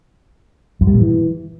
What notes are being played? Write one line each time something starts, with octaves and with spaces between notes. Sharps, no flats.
F#2
G3
A#2
E3